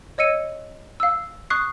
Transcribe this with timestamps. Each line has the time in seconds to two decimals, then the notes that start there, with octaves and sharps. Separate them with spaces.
0.18 C#5 D#5 E6 C#7 D#7
1.00 F5 E6
1.50 C#6 D#6 F#6 C7